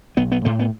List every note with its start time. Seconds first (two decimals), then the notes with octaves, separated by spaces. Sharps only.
0.17 B1 B3
0.32 B3
0.45 A2 A3
0.59 B3